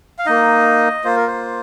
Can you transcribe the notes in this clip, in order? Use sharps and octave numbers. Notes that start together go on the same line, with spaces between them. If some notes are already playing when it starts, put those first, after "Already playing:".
F5
A#3 D#4 D#5
A#3 F4 C5
A#4
C5